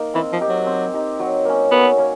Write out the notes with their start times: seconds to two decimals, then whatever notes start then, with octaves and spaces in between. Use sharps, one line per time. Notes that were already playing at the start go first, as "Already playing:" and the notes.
Already playing: A#3 D#4
0.14 E3 C4
0.32 F3
0.41 D#4 G4
0.49 F#3
0.66 C4
0.94 D#4 G4
1.19 F#3
1.45 A#3 C#4
1.71 F#3 B3
1.98 A#3 C#4